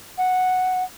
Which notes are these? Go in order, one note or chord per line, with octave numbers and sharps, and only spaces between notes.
F#5